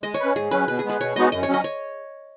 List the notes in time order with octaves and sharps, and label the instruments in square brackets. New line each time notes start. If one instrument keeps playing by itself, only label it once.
[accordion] G#3 [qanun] D#5
[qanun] C#5
[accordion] C#4 B4
[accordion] G#2 [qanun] G#4
[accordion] F#3 C#4 [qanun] B4
[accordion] B2 [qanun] B4
[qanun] G#4
[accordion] G#3 B3 [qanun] B4
[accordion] B2 [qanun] C#5
[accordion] G#3 B3 D#4 F#4 [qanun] D#5
[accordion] F#2 [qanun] D#5
[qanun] C#5
[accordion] F#3 C#4
[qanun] D#5
C#5